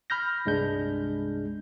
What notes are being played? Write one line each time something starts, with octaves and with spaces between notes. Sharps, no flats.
B5 F6 G6 A#6
C2 G2 G#3 D4 G6